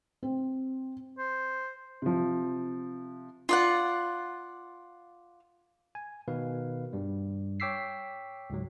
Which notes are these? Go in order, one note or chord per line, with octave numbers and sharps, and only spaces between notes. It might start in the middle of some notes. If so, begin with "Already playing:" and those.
C4
C5
C3 F3
F4 D5 F#5
G#5
B2 D#3 B4 F5
G2 G3
C#5 G5 D6 E6 B6 C7
C#2 G#2 F#3